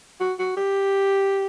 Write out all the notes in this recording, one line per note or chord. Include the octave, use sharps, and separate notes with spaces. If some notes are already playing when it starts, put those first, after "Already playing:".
F#4
F#4
G4